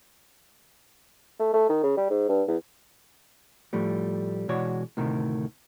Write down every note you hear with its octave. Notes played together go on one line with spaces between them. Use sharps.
A3
A3
D#3
C#3
G3
G#2
G2
E2
A2 F3 G3 A3
B2 E3 G#3 F#4 C#5 D5
D2 A2 C3 D#3